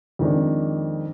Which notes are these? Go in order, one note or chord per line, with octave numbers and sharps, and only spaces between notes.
F2 D#3 G#3 D4